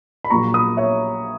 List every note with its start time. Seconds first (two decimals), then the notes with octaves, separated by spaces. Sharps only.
0.25 B5
0.30 A#1 A#2 F#3 A#5 C#6
0.54 B5 D#6
0.77 C#5 E5